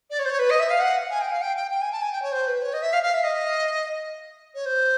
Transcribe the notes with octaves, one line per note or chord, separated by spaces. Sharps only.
D5
C#5
C5
C#5
B4
D#5
E5
F5
F#5
G#5
G5
F5
G5
G5
G5
G#5
A5
G#5
G5
C#5
C5
B4
C#5
D#5
E5
F5
F5
E5
D#5
C#5
C5